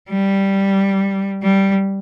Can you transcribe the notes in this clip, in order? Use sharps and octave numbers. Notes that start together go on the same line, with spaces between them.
G3
G3